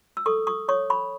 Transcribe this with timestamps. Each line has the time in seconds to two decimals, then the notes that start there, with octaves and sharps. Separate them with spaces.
0.17 E6
0.26 A4 C#6 D#6
0.47 C#6 D#6
0.68 C#5 C#6 D#6
0.90 B5 C#6